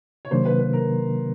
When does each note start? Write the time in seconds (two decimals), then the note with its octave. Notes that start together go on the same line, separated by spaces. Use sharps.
0.25 C#5
0.31 C3 D#3 F#3 A#3 D4 C5
0.45 B4
0.59 B4
0.73 A#4